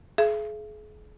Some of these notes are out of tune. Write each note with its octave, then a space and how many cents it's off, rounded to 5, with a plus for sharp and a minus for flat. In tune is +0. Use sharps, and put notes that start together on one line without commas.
G#4 +35 E5 +45